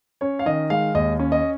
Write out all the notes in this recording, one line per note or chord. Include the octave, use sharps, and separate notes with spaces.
C#4 C#5
F5
D#3 D#5
G#3 F5
D#2 D#5
C#4
D#5